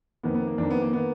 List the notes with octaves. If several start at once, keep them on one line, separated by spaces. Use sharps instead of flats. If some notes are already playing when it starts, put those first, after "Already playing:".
F2 D#3 A#3 B3
B3
A#3
F2 D#3 A#3 D4
B3
A#3
D#3 A#3 B3